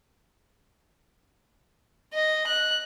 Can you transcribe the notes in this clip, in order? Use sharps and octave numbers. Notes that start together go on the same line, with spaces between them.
D#5
F#6